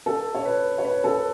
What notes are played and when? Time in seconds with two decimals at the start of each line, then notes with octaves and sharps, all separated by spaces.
0.06 A4
0.35 C#5
0.45 B4
0.78 C#5
0.85 B4
1.04 A4